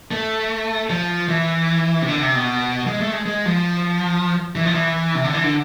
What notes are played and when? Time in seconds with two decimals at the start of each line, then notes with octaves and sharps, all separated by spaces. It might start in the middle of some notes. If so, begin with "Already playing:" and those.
0.11 A3
0.90 F3
1.28 E3
2.02 C3
2.08 D3
2.21 C3
2.34 B2
2.87 G#3
3.01 A3
3.13 G#3
3.26 G#3
3.46 F3
4.55 E3
4.65 F3
4.74 E3
5.15 C3
5.24 D3
5.34 E3
5.44 D3